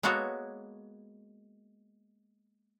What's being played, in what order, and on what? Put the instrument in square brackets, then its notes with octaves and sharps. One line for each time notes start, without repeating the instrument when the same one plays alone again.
[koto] G#3 A#3 B3 F#4 A4 C#5